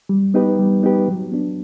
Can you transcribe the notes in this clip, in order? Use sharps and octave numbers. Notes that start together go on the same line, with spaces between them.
G3
B3 D#4 G4 B4
G3
B3 D#4 G4 B4
F#3
B3 D4